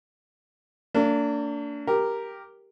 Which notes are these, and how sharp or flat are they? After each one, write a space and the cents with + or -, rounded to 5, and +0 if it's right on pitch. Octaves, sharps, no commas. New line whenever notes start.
A#3 -45 D4 -25
G4 +0 A#4 +0